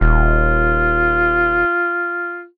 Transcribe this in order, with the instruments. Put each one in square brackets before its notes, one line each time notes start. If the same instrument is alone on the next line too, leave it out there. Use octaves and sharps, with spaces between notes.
[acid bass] D#1 [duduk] F4